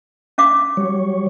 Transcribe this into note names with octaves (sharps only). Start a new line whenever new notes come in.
C#4 F5 D6
F#3 G3 C#5